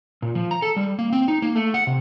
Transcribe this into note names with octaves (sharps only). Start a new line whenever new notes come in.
A#2
F3
A#5
A4
G3
A#3
C4
D#4
A#3
A3
F#5
C3